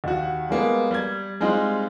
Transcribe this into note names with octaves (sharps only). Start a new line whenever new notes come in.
D#2 F#4
G3 G#3 A#3 B3
G3 G#6
G3 G#3 C4 D#4 F4